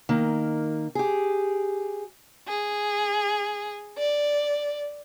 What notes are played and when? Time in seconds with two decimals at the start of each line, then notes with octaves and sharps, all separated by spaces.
0.09 D#3 A#3
0.95 G4 G#4
2.48 G#4
3.98 D5